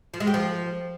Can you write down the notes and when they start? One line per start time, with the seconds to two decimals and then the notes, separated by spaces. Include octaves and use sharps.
0.14 F3
0.20 G#3
0.27 G4
0.34 F3